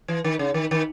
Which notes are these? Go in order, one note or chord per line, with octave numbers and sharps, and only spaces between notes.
E3
D#3
C#3
D#3
D#3